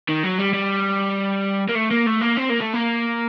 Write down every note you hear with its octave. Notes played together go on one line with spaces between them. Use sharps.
D#3
F#3
G3
G3
A#3
A3
A#3
A3
A#3
C4
A#3
A3
A#3